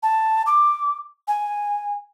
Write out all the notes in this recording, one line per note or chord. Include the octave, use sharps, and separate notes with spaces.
A5
D6
G#5